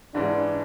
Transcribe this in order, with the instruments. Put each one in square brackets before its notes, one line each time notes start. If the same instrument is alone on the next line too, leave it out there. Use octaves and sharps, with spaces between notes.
[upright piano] G#2 E3 G#3 C#4 [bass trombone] D4